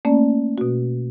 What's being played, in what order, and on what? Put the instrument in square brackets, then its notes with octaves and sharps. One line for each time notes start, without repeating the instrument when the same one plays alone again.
[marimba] A3 A#3 C#4 D5
B2 F#4